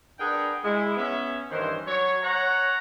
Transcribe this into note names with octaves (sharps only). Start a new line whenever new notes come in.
D4 G#4 A#4 B4 F#5 G5
G#3 E4
B3 C#4 E5
G2 D#3 E3 C#4 C5
F#3 C#5
C#5 F#5 A#5